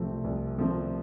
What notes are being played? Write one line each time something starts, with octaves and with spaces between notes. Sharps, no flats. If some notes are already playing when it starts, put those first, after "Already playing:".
Already playing: C2 C3 F3 A3 C4
C2
C3 F3 A3 C4